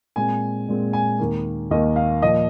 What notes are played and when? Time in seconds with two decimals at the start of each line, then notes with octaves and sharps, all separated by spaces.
0.16 A#2 G#3 C4 G#5
0.68 A#2 G#3 C4
0.93 G#5
1.19 D#2 D#3 A#3
1.71 D#2 D#3 A#3 D#5
1.96 F5
2.22 A#2 F3 A#3 D#5